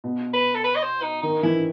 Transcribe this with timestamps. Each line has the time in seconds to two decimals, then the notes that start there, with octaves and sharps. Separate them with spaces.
0.04 B2
0.33 B4
0.54 A4
0.64 B4
0.76 D#5
0.83 C5
1.02 D#4
1.22 D#3 D#4
1.43 E3 E4